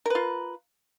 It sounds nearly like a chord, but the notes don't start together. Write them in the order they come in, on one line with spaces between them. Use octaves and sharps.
A#4 B4 F4